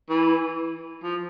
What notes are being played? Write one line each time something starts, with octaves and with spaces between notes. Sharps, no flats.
E3
F3